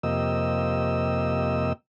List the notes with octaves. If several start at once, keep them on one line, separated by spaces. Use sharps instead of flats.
F2 C3 A#3 G4 D#5 E6